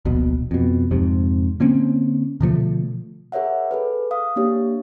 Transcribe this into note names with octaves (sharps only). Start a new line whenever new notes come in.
D1 A#1 B2
F2 B2
F2 G#2 C3
D3 A#3 C4 C#4
B2 D3 F3 A3
G#4 A#4 C#5 E5 F#5
G#4 A4 B4
F5 D#6
A#3 D4 G4 C#5